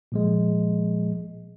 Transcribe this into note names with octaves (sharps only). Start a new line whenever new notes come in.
A#2 F3 G#3